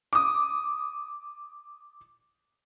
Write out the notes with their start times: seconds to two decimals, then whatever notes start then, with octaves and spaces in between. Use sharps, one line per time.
0.13 D6 D#6